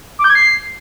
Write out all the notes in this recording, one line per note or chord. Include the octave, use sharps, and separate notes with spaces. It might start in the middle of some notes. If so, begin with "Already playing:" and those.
D6
G6
G#6
C7